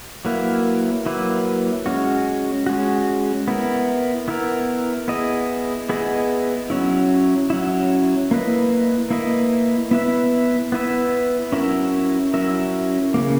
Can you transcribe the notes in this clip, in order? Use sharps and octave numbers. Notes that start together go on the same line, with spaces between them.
F#3 A#3 E4 B4
F#3 A#3 E4 B4
G#3 C#4 F#4
G#3 C#4 F#4
B3 E4 A#4
B3 E4 A#4
B3 E4 G#4 D#5
B3 E4 G#4 D#5
F#3 C#4 E4
F#3 C#4 E4
A#3 E4 B4 D#5
A#3 E4 B4 D#5
B3 E4 B4 E5
B3 E4 B4 E5
F#3 C#4 E4 A#4 E5
F#3 C#4 E4 A#4 E5
C#3 F#3 A#3